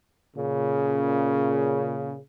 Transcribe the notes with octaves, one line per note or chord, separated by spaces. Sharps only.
A#2 C#3